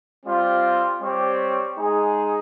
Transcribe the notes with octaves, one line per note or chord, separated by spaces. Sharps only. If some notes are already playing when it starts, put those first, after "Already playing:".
G3 C4 F4
G3 C4 G4 C#5
G#3 D#4 G#4